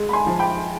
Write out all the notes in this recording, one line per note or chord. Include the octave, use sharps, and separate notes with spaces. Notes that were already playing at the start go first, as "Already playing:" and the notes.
Already playing: G#3
B5
G#5 C6
F3
G5 B5